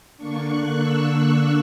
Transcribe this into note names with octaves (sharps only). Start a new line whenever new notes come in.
D3 A#3 D4 C#6
F#6
E6
F#6